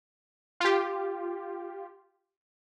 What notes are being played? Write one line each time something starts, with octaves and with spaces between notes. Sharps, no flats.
F4 G4